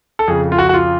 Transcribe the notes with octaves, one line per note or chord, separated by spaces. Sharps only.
A4
F2 C#3 G#4
F4
F#4
F#4
F4